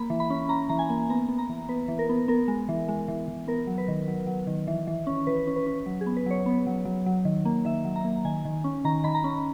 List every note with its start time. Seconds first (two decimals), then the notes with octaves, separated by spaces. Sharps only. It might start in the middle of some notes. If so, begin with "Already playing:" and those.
Already playing: A#3 B5
0.10 E3
0.20 B5
0.30 C#4
0.49 C#4 A#5
0.69 E3 A#5
0.79 G#5
0.89 A#3
1.10 B3 A#5
1.29 B3
1.38 A#5
1.49 E3
1.68 B3 B4
1.88 E3
1.99 A#4
2.09 B3
2.28 B3 A#4
2.48 G#3
2.69 E3
2.88 G#3
3.08 E3
3.28 E3
3.48 B3 A#4
3.67 F#3
3.78 B4
3.88 D#3
4.08 F#3
4.27 F#3
4.47 D#3
4.67 E3
4.87 E3
5.07 C#4
5.27 E3 B4
5.47 C#4
5.56 B4
5.66 C#4
5.86 F#3
6.01 G#4
6.06 B3
6.17 B4
6.26 F#3 C#5
6.46 B3
6.66 F#3
6.85 F#3
7.06 F#3
7.25 D#3
7.45 A#3
7.65 D#3 E5
7.85 F#3
7.96 A#5
8.04 A#3
8.25 D#3 G#5
8.45 D#3
8.64 C#4
8.85 D#3 A#5
9.04 D#3 B5
9.14 A#5
9.24 C#4